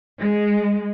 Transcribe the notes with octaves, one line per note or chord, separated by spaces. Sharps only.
G#3